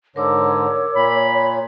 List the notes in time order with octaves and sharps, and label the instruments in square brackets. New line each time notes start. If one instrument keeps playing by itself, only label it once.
[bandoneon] G#2 D3 [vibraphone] A#4 D6 E6 [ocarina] C#5
[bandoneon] A#2 [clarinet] B5